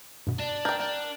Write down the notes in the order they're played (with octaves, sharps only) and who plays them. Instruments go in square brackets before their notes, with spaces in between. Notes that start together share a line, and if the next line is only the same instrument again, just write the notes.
[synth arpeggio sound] G2 B2
[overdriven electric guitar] D4
[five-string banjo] A#4 G5 [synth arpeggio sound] G6
[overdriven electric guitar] D4